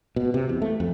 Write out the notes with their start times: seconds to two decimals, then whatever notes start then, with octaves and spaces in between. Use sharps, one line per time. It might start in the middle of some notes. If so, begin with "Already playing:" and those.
0.16 B2
0.34 C3
0.49 E2
0.62 A3
0.80 F2